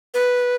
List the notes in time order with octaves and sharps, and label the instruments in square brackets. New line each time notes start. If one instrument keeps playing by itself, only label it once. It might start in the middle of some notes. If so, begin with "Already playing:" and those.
[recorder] B4